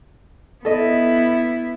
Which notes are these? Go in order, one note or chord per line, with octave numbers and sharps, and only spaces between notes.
B3 E4 A4 D#5